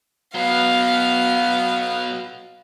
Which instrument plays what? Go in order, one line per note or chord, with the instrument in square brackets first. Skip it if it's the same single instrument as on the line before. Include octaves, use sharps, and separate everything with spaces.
[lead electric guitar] B2 F#3 [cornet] B3 [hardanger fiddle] F5